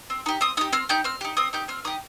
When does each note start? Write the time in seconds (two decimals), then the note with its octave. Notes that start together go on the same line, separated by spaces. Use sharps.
0.10 C4
0.26 D#4 G4
0.41 C4 D#6
0.57 D#4 G4 D#6
0.73 C4 F6
0.89 D#4 G4 G6
1.04 C4 F6
1.21 D#4 G4
1.37 C4 D#6
1.53 D#4 G4 G6
1.68 C4 F6
1.85 D#4 G4 D#6